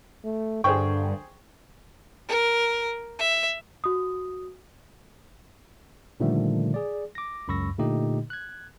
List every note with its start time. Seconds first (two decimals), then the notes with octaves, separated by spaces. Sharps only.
0.25 A3
0.64 G2 D3 G#4 C5 G5 C#6
2.28 A#4
3.19 E5
3.84 F#4 D#6
6.20 A#2 D3 D#3 F3 G3 A3
6.74 G#4 D5
7.15 D6 A#6
7.48 C#2 F#2 B5 C#6 E6 A#6
7.78 A#2 D3 A3 D#4 G4 D#5
8.30 F#6 G#6